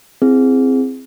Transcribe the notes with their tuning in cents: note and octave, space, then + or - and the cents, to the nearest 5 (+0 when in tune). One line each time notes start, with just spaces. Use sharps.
C4 +0 E4 +20 G#4 +0